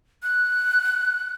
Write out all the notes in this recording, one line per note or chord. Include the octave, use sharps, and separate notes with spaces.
F#6